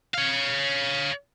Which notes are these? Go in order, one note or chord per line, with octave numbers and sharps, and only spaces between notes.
C#5 F5